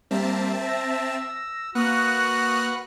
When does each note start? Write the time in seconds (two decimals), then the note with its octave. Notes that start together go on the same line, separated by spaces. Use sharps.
0.11 G3 A#3 C4 E5 A5
0.66 E6 A#6
1.75 A#3 F#4 B4 F#5 C#6 D#6 F6 F#6